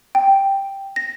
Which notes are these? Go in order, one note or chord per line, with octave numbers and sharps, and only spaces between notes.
G5
A#6